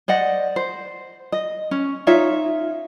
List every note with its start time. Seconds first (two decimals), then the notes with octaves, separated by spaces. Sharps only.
0.08 C5 D5 D#5 F#5
0.56 C5
1.32 D#5
1.71 C#4
2.07 D#4 F4 C#5 E5